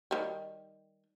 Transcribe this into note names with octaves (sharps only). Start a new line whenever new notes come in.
D#3 G3